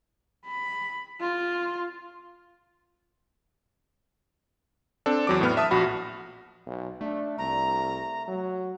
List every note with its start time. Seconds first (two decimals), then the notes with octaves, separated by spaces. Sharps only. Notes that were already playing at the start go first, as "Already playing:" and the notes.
0.46 B5
1.20 F4
5.06 C4 D4 A4
5.27 E2 F#3 D6
5.41 A2 B3 F6
5.57 E5 A5 D#6
5.71 A#1 F#4 B5
6.66 B1
7.01 A3 D4
7.38 C2 A#5
8.28 F#3